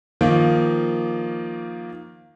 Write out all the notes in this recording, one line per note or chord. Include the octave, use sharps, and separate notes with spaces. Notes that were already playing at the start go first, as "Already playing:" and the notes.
D#3 F3 A#3